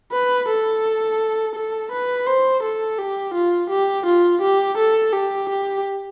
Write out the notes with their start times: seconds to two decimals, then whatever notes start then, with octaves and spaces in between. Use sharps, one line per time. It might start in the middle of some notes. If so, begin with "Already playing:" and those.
0.12 B4
0.48 A4
1.55 A4
1.91 B4
2.27 C5
2.63 A4
2.98 G4
3.34 F4
3.70 G4
4.06 F4
4.41 G4
4.77 A4
5.13 G4
5.49 G4